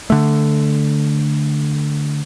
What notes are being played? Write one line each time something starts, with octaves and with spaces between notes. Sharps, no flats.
D3 A3